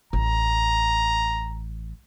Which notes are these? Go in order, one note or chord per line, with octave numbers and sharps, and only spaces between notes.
A1 A#5